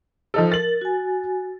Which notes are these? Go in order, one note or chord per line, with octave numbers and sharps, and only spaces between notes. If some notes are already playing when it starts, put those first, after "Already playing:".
F3 D#4 A4
A#4 A6 F#7
F#4 G#5